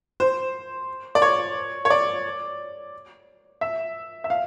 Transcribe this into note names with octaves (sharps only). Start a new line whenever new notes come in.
C5
D5
C#5
C#5
D5
E5
E5
F5